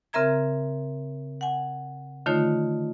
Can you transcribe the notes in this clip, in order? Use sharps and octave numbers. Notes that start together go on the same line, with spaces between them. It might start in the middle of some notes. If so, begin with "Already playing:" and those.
C#3 C4 A#4 E5 A#5 G#6
F#5 G#5
D3 D#3 A3 D#4 F4 C#5